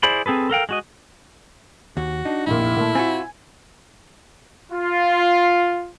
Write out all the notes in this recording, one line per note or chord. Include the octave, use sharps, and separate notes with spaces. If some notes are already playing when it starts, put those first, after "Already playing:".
E4 G#4 C5 D5 B5
C4 G#4 A4 B4
A4 A#4 F5 G5
G#3 F#4 D#5
D#2 F#4
D4 D#4
F1 A#1 A#2 E4
A#2 A3
C4 F4 F#4 G#5
F4